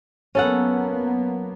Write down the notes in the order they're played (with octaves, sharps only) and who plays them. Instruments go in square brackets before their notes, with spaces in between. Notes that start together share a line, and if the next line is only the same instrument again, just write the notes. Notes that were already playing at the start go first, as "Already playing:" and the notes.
[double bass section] F#3 A#3 B3 [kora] C#4 A4 F#5